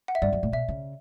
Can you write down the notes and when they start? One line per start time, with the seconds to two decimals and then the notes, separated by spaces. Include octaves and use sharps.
0.08 F#5
0.15 E5
0.22 G2 D5
0.33 F#2
0.43 A2
0.52 B2 E5
0.68 C#3